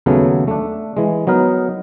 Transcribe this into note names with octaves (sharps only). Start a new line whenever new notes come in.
D#2 C#3 F#3 A3 B3 C#4
A3 D4
E3 G#3
F#3 B3 D#4 A#4